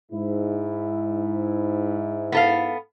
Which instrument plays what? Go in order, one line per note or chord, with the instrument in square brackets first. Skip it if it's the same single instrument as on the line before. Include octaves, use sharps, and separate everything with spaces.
[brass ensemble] G#2 E4
[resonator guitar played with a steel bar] B3 A4 F5